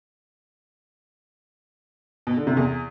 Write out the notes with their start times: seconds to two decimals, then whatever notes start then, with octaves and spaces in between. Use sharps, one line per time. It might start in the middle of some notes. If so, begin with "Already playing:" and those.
2.27 B2
2.37 D3
2.47 C3
2.57 E2